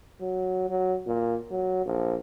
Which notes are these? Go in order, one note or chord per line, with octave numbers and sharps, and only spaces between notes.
F#3
F#3
A#2
F#3
A#1